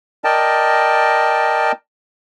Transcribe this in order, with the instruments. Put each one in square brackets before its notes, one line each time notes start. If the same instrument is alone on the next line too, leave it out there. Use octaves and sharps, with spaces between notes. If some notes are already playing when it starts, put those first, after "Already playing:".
[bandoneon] A#4 D5 D#5 G5 A5